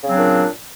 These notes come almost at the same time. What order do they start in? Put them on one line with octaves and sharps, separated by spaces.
C#3 C4 F#3 D4 A#2